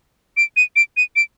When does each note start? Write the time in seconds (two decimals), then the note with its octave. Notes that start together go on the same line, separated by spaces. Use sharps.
0.37 D7
0.57 D#7
0.76 D7
0.97 D#7
1.16 D7